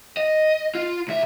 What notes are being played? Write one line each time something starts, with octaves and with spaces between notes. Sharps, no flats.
D#5
F4
C2 E5